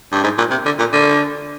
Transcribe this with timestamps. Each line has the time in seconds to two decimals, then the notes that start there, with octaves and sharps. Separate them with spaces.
0.12 G2
0.23 G#2
0.38 A#2
0.51 C3
0.65 D3
0.79 A#2
0.93 D3